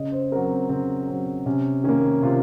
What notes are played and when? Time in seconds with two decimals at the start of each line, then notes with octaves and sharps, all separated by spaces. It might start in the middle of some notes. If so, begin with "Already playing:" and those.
Already playing: C#3 D#5
0.12 C5
0.32 F#3 C4 A#4
0.51 C4
0.69 C#3 C4
1.08 F#3 C4
1.46 C3 C#4
1.84 D#3 A#3 C#4
2.23 C3 F4